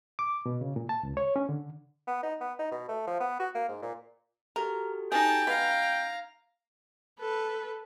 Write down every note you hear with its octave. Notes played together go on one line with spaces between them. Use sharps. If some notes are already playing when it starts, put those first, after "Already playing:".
D6
B2
C#3
A#2
A5
C#2
C#5
C#4
D3
B3
D#4
B3
D#4
B2
A3
F3
B3
F#4
A#3
G#2
A#2
F#4 G4 A4 A#4
D#4 G#4 G5 A5
G#3 B3 F5 A#5 G#6
A4 B4